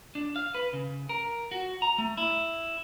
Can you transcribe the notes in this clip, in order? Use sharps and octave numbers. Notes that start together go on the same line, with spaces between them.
D4
F5
B4
C#3
A#4
F#4
A#5
A3
E4